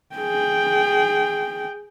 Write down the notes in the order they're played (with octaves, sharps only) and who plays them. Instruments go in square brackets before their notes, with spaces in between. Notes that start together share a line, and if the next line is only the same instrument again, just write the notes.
[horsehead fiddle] G#4 G5